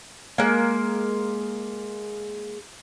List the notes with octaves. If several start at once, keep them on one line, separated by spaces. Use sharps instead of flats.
G#3 A#3